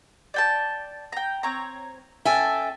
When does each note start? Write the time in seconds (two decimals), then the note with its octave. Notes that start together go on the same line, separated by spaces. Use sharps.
0.34 D5 G5 A5
1.12 G5 A#5
1.43 C4 C#5 A#5
2.25 C#4 A4 E5 G5 G#5